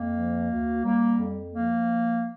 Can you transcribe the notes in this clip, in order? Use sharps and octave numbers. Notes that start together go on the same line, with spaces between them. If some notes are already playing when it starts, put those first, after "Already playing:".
Already playing: F2 A#3
F3
D2
G3 A#3
F2
F3 A#3